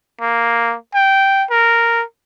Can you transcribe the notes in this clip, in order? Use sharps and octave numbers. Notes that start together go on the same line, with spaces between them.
A#3
G5
A#4